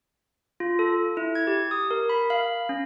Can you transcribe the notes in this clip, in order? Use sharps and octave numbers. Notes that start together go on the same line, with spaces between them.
F4
A4
E4
G#6
G4
D#6
A#4
B5
F5
C#4